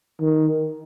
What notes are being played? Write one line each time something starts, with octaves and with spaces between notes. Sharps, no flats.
D#3